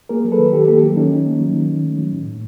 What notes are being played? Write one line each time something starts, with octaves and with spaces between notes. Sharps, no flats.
A#3 G#4 A#4
F#3
A4 B4
D#3
D#3 G4 A4
A#3 G4 A4
F#3
D#3 C#4 D#4
D#3
A#3
F#3
D#3
D#3
A3
F#3
A2
A2